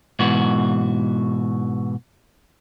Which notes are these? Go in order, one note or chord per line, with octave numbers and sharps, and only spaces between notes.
G#2 B2 E3 F#4